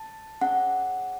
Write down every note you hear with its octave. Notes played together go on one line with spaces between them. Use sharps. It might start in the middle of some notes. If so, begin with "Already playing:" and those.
Already playing: A5
C#4 G#4 F#5